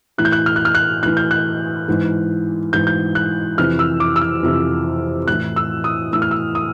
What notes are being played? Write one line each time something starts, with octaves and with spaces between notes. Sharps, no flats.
A2 E3 F#6
G6
F#6
F6
F#6
F6
F#6
A2 E3 F#6
G6
F#6
G#2 E3
G#2 E3 G6
G6
F#6
F2 C3 E3 F6
E6
D6
E6
F6
F2 C3 E3
A2 E3 F#6
E6
D#6
A2 E3 E6
F6
E6
D#6